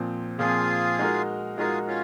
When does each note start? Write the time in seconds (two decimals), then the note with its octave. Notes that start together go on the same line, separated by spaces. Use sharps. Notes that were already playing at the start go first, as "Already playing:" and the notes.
Already playing: A#2 F3 C4
0.38 A#2 F3 C4 F4 G#4
0.99 G#3 D#4 F#4 A#4
1.57 G#3 D#4 F4 F#4 G#4 A#4
1.88 C#4 F4